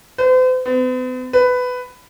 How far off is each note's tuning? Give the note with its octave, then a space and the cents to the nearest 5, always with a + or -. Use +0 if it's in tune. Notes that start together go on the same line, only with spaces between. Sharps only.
C5 -45
B3 +45
B4 +15